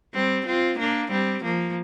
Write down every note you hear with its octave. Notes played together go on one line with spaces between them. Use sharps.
G3 C4
C4 F4
A#3 D4
G3 C4
F3 A#3